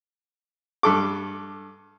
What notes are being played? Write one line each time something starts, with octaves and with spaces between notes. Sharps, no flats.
G2 A4 D6